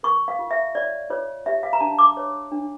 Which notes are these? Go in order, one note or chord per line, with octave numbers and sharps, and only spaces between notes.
A#4 C#6
F5
F4
E5
C#5 D5
F4 C#5
G4 E5
F5
A#5
D4 A5
D6
C#5
D4